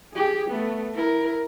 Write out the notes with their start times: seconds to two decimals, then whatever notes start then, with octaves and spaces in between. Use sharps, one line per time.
0.13 G4 G#4
0.49 A3 B3
0.94 E4 A#4